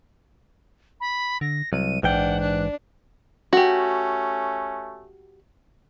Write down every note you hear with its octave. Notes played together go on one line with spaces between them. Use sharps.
B5
D3 A#6
C2 F#3 D#7
A#1 G#2 E3 D4 F#5 G5
D4 F#6
A3 C#4 F#4 G4